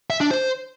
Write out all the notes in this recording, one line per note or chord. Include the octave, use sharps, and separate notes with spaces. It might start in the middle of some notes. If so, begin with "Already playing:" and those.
E5
D4
C5